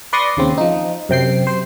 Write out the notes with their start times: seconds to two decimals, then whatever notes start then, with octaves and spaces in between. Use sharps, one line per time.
0.13 B4 D5 C6 C#6 D#6 A#6
0.37 D#2 C#3 C4
0.58 F3 D#4
1.09 F#2 C3 G5 C7
1.47 C5